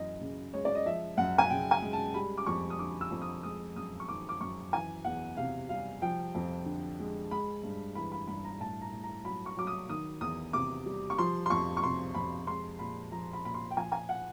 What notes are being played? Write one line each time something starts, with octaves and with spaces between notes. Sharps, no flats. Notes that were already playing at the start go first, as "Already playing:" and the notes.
Already playing: F#2 E3 D#5
C#3
G#3 C#5
D5
D#5
F3 E5
F#2 F#5
G#5
C#3 G5
G#5
G#3
A5
G3 B5
D6
F2 C#6
D#6
D3 D6
E6
F2
D#6
G#3 D#6
F#2 D#6
C#6
D#3 D6
D6
F#2 C#6
E3 G#5
E2 F#5
C3 F5
G3 F5
F3 G5
F2
D3
G#3
G#3 B5
G2
E3 B5
B5
G2 B5
A#5
A2 A5
A#5
A2
A#5
F#3 B5
C#6
F#3 D6
D#6
D#3 D#6
E2 D#6
C3 D6
G3
C#6
F3 C6
C6
F2 C#6
C#6
C3 C6
F2 B5
G#3 C6
A#2 B5
F3 A#5
B5
A#2 B5
C6
G5
F3 G#5
G#5
F#5